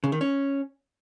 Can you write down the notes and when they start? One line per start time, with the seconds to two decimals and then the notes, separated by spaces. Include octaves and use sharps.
0.04 C#3
0.12 D#3
0.21 C#4